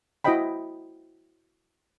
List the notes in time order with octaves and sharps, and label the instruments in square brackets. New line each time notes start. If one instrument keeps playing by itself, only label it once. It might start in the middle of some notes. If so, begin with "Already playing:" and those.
[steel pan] E4 F#4 C5 D#5 G5 B5